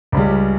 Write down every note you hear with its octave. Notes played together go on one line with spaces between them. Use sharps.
C#2 C#3 G3